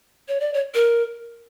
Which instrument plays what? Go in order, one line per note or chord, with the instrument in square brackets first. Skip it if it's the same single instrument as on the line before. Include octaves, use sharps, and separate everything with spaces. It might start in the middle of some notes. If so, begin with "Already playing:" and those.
[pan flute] C#5
D5
C#5
A#4